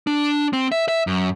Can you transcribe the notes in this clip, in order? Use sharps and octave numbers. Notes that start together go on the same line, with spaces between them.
D4
C4
E5
E5
F#2